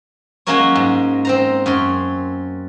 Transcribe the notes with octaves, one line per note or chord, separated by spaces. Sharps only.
F#3 G#3 A#3 C#4 A#4 C#5
G#2
C4 C5 A#5
F#2 C#5 C6